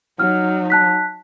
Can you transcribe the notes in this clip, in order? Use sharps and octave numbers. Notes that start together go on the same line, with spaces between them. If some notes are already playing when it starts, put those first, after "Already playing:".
F#3 D#4 F6
A5 F#6 B6